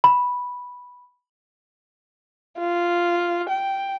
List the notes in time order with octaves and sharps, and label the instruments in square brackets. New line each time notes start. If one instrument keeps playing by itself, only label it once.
[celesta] B5
[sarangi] F4
G5